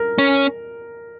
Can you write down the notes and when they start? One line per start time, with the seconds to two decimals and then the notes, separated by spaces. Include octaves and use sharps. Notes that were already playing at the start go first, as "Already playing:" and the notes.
Already playing: A#4
0.18 C#4